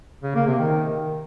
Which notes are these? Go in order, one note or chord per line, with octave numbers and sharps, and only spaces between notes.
C#3
A#3
C3
D#3